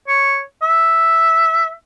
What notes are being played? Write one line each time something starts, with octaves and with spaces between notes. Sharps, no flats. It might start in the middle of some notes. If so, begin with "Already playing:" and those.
C#5
E5